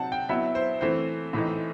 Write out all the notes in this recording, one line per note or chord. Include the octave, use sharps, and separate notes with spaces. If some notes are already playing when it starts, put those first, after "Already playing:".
Already playing: C3 F#3 C4 D#4 F#5 A5
G5
F#3 B3 E4 E5
C5
E3 A3 C4 C5
A2 E3 A3 D#4